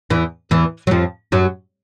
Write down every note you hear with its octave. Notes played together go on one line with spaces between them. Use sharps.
E2 E3
E2 E3
F#3
F2 F3
F#2 F#3